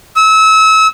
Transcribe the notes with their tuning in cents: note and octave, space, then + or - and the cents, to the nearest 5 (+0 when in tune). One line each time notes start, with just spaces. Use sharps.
E6 -30